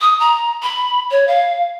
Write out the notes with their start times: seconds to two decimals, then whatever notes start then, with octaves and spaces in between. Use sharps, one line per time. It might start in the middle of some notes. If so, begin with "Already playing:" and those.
0.01 D#6
0.20 A#5
0.62 B5
1.11 C#5
1.27 F5